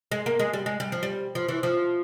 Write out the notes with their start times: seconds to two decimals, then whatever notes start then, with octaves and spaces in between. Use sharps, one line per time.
0.11 G#3
0.26 A#3
0.39 G#3
0.53 G3
0.66 G#3
0.80 G3
0.92 F3
1.03 G3
1.35 F3
1.48 E3
1.63 F3